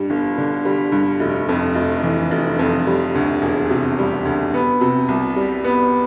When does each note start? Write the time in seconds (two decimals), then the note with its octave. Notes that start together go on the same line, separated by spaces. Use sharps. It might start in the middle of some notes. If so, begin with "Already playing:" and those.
Already playing: G2 G3
0.10 G1
0.38 D3
0.65 G3
0.92 G2
1.20 F1
1.49 F2
1.75 F1
2.03 E3
2.31 F1
2.59 F2
2.87 G3
3.15 D2
3.42 E1
3.70 C3
3.99 G3
4.25 D2
4.54 B3
4.81 C3
5.08 C2
5.36 G3
5.64 B3